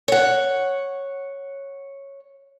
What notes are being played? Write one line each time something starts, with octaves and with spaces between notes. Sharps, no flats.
C#5 F#5